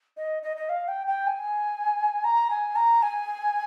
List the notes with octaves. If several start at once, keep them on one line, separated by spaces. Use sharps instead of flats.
D#5
D#5
D#5
F5
G5
G5
G#5
A#5
G#5
A#5
G#5